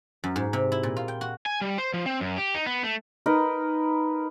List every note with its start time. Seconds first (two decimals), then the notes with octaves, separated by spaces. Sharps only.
0.24 F#2
0.36 G#2
0.53 C3
0.72 E4
0.83 A#2
0.97 F4
1.08 G5
1.21 F#4
1.46 G#5
1.61 G3
1.78 C5
1.94 F3
2.06 C4
2.20 F#2
2.38 G4
2.54 D#4
2.67 B3
2.83 A3
3.26 D#4 A#4 B4 D#5